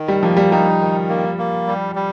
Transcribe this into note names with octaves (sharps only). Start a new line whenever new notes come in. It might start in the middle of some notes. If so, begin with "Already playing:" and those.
Already playing: D#3
G3
F3 A#3
G3
G3 D#4
D#3
A#3
A#3
G3
G3